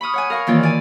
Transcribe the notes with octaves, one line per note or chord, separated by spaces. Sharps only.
B5 C#6 D#6 F6
C#5 F#5 G#5
A#4 F5 C#6
D#3 E3 A#3 F4 C#5 D5
F4 D5 G#5